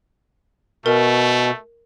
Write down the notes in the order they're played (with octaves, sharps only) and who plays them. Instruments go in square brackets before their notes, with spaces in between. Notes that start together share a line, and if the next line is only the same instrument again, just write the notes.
[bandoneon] B2 [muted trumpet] A3 [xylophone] A#4